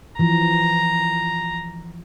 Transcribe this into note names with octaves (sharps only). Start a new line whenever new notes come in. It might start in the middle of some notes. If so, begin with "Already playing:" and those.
E3 F3 A#5